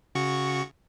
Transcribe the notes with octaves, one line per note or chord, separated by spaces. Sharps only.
C#3 F#4 C#6